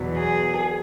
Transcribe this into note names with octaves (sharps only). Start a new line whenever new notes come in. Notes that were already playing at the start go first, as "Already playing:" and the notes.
Already playing: E2 B2 F#3
G#4